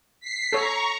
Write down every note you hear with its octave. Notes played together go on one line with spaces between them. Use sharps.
B6 C7
A4 C#5 A#5 C#6